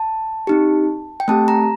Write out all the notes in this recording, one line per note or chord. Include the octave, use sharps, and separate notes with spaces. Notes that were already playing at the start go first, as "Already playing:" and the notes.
Already playing: A5
C4 D#4 G4
G5
A3 C4 G4 A5
A#5